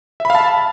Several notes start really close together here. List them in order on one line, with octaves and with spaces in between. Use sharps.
E5 B5 F5 A5